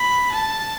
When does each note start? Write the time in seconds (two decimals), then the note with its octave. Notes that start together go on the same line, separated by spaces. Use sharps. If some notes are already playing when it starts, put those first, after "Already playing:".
Already playing: B5
0.32 A5